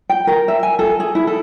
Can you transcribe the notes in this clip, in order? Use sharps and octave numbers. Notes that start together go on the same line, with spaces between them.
G5
A#4
E5
G#5
A4
G#4
E4
A4